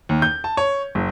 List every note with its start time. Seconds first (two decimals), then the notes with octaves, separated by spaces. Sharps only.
0.09 D#2
0.22 G6
0.44 A5
0.57 C#5
0.95 F#1